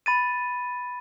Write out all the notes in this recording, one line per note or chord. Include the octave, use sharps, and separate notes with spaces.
B5 A6 D#7